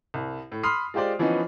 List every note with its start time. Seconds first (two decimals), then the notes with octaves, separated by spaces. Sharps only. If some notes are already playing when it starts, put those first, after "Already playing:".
0.14 C2
0.52 A2
0.63 B5 C6 D#6 F6 C7
0.94 G#3 F4 G4 C5 D5
1.19 E3 F3 B3 C#4 D#4